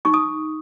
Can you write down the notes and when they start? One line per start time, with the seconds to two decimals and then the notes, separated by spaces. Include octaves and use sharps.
0.05 D#4 C#6
0.14 D#6